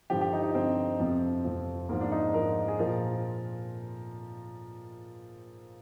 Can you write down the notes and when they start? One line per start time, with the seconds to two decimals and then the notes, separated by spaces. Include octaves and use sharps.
0.10 G2 D3 F3 G4
0.21 G4
0.33 D#4
0.43 D#4
0.54 G2 D3 F3 C4
1.00 F2 C3 F3
1.44 F2 C3 F3
1.89 G#2 F3 A#3
2.01 D4
2.12 D#4
2.34 G#2 F3 A#4
2.68 G#4
2.79 A#2 F3 A#4